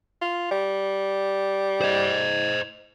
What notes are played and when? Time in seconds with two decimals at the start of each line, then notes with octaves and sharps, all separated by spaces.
0.22 F4
0.51 G3
1.82 C5 D#5